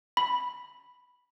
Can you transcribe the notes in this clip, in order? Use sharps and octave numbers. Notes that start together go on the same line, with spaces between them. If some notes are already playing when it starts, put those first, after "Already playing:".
B5